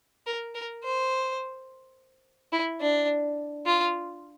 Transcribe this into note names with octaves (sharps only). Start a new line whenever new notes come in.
A#4
A#4
C5
E4
D4
F4